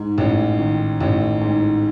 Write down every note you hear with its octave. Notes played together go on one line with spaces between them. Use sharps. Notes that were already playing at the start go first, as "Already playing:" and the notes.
Already playing: G#2
A1
D#3
A1
G#2